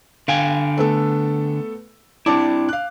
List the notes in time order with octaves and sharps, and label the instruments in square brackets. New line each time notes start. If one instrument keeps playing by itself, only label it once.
[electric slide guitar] D3 G5 G#5 [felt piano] F5
[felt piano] A3 B3 A4
[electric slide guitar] C4 E4 [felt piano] D4 A5 D6
[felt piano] F5 F#6